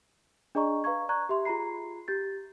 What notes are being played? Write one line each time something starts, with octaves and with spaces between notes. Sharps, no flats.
D4 G#4 D5 D#5 A#5 C#6
B4 F5 A#5 C#6 G#6
D5 A#5 C#6 F#6 G#6
G4 E5 C6
F4 G#4 A#5 B5 C7
G4 G6 A6